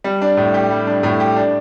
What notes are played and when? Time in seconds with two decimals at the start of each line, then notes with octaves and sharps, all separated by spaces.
0.04 G3
0.22 D4
0.37 A2
0.54 G4
0.70 G3
0.87 D4
1.03 A2
1.20 G4
1.36 D4